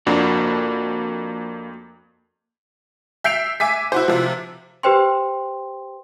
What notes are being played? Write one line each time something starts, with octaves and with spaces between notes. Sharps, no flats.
F2 A#3 D4 F#4
E5 G6 C7 D7 F7
E5 G#5 D6 B6
E4 F#4 C5
C3 F3
G4 B4 C5 G5 C6